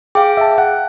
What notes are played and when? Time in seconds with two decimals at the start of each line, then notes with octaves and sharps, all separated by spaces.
0.15 G#4 F5 G5 D6
0.37 E5 A5
0.58 F#5